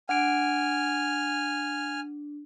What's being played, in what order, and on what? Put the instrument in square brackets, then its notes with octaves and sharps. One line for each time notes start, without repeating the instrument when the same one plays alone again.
[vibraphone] D4 [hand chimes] F#5 D7 [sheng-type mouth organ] G#5 F6